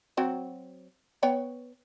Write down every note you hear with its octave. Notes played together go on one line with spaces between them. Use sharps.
F#3 C4 F#4
B3 C#5 G5